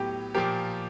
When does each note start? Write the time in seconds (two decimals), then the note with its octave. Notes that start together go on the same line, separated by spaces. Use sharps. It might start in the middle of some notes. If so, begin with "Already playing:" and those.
Already playing: A2 F#3 B3 G4
0.34 A#2 F3 A#3 G4